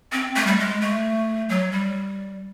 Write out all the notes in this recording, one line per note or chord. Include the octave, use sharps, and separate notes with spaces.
C4
A3
G3
G#3
A3
F#3
G3